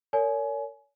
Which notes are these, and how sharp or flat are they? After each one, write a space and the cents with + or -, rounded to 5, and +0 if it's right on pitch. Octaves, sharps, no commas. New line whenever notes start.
A#4 -30 C#5 +40 G#5 +25